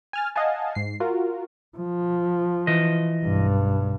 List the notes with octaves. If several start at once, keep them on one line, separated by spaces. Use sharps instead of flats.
G#5 F6 A6
D#5 F5 F#5 G#5 A5
G#2 C7
F4 F#4 A#4
F3
E3 D#5
B1 G2